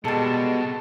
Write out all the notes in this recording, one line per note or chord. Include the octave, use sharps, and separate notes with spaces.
B2 G3 G#3 A4 A5